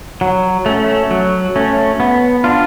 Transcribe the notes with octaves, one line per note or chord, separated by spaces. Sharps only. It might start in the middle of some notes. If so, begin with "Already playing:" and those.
F#3
A3 C#4
F#3
A3 C#4
B3
D4 F4